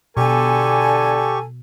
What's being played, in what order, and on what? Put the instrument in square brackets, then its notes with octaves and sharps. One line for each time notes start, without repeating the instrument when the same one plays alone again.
[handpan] B2 [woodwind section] D3 G#5 [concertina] G4 C#6 [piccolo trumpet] A4